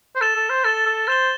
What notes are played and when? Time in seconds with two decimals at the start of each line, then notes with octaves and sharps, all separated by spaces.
0.16 C5
0.21 A4 A6 E7 G7
0.36 A4
0.49 C5
0.64 A4 A6 E7 G7
0.86 A4
1.07 C5 A6 E7 G7